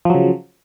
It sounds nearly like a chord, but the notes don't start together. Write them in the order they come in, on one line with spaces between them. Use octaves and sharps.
F3 F#3 C#3